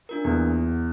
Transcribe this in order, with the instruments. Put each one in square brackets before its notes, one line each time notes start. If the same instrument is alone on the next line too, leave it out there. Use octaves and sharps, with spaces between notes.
[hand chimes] D4 F4 A#4
[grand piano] E2 [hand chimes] A#3